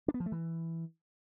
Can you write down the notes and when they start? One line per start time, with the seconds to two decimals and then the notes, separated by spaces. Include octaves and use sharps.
0.08 D4
0.14 B3
0.20 F3
0.26 A3
0.32 E3